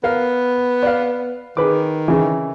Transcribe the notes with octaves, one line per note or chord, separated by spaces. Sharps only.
B3 A#4 F5
D5 F5
D#3 G#4 B4 D6
C#3 E3